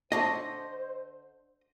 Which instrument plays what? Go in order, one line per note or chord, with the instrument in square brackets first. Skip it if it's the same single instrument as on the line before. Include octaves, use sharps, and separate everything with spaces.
[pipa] D3 D4 C#5 [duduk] C5 [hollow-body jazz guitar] D#5